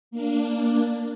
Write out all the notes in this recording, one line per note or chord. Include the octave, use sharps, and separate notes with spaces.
A#3 D4